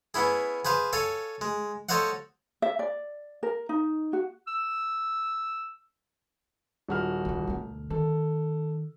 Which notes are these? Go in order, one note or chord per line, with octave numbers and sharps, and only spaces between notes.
B3 C#4 E4 G#4
G#4 B4 C5 F5
A4 C#5 F5 G#5
G#3
A4 C5 C#5 D#5 F5 F#5
E5
D5
A#4
D#4
F#4
E6
D#1 F#4 F6
C2 D#3
D2 B2
D#3 A4